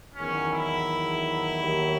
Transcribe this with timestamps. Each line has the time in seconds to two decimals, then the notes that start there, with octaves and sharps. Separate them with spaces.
0.14 E2 D#3 F#3 C#4
0.51 E4
1.60 D#2 D#3 F#3